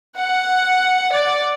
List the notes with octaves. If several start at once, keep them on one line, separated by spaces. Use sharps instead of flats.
F#5
D5